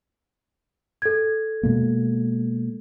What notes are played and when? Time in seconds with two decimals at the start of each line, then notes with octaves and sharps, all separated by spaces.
1.02 A4 G#6
1.63 B2 G#3 A#3